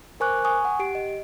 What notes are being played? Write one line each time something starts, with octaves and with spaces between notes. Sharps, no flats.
A#4 C5 G#5 C#6 D6 F#6
G#5 C#6 D#6
F#5
G4 D7
D#5